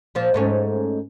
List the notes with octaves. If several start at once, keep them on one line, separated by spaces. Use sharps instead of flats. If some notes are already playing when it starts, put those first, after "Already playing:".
A#2 F3
G#2 A3 C#4